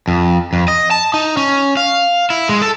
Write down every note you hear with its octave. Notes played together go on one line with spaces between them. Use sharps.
F2
F2
D#5
A5
D#4
C#4
F5
E4
G#3
A4